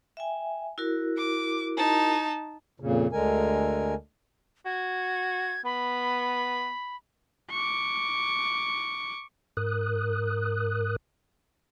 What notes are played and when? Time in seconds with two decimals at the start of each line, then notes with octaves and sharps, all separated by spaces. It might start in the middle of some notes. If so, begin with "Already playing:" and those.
0.17 E5 G5 G#5
0.78 E4 F#4 A#4
1.18 D6
1.77 D#4 A5
2.80 F2 A#2 C#3
3.12 D2 D3 G#3 A#4 G#5
4.66 F#4 G#6
5.65 B3 B5
7.51 C#6 D6
9.57 G#2 A#4 D#6 F#6